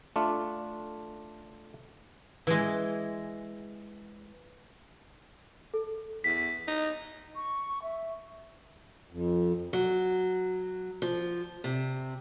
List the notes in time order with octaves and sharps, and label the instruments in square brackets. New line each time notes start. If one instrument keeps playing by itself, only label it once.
[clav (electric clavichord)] A3 D4 F4
[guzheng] E3 G#3
[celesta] A4
[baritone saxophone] E2 [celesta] B6
[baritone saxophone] D#4
[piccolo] C#6
E5
[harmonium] F2
[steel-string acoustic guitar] F#3
F3
C3